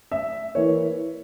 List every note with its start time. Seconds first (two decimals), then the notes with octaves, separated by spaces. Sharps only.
0.12 E5
0.55 E3 A#3 C#5